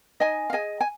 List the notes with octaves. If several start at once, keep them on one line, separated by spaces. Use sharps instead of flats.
D#4 D#5 G#5
F5
G#4 D#5 G#5
G#5